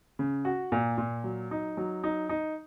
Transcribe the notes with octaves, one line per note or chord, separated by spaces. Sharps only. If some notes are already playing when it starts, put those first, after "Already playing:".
C#3
F#4
A#2
A#2
F#3
D#4
F#3
D#4
D#4